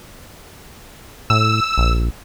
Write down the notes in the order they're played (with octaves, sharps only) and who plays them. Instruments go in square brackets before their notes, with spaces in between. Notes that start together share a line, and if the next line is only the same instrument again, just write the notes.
[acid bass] A2 [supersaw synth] E6
[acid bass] A#1